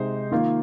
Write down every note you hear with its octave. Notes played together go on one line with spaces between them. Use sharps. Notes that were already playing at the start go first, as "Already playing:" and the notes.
Already playing: C3 G#3 D#4 C5
D#3 A#3 F4